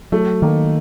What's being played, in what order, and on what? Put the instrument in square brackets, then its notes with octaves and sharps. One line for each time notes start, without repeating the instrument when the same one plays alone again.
[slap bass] F#3 [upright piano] A3
[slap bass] D#3 [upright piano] A#3